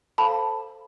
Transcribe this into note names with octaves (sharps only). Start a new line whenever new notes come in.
A4 C5 F5 A5 B5